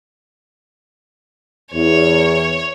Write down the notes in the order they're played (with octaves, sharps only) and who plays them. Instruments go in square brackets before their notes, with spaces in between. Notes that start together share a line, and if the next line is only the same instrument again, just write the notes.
[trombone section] E2 [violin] C#5